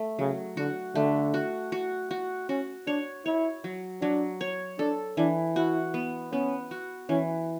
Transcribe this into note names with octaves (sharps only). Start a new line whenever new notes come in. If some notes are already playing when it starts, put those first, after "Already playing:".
Already playing: A3
C#3 F#3
D3 F#4
D3 A3
F#4
F#4
F#4
C#4 F#4
D4 C#5
E4 C#5
F#3
F#3 D4
C#5
D4 A4
E3 D4
E4 F#4
B3
B3 C#4
F#4
E3 C#4